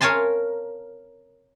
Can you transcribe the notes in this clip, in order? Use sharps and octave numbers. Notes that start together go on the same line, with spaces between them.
A#4 C#5 F5 G#5 A5 C6